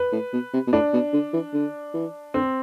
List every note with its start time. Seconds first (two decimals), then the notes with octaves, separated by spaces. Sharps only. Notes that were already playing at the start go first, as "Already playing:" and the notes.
Already playing: B4
0.12 A2
0.33 B2
0.53 C3
0.67 B2
0.73 A2 D4
0.93 B2
1.13 D3
1.33 E3
1.53 D3
1.94 E3
2.34 D3 C4